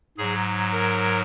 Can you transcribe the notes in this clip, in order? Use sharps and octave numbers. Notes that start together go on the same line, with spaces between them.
G#2 F#3 G#4
A#4